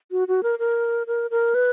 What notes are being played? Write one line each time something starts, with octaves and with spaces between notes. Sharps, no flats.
F#4
F#4
A#4
A#4
A#4
A#4
B4